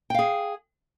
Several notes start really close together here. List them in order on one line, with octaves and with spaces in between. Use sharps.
G5 F5 G#4